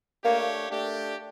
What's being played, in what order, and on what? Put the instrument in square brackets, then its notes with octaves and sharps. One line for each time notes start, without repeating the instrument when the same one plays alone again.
[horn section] A3 D4 G4 C#5 [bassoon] A#3
[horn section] A3 D4 G4